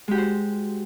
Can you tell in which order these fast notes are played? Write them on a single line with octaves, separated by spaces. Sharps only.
G#3 G4 F#4 C5